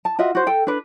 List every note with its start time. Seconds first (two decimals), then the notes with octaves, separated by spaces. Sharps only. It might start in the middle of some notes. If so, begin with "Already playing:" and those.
0.05 A5
0.19 F4 F#4 D#5 E5
0.35 F#4 C5
0.47 A4 G5
0.67 D4 B4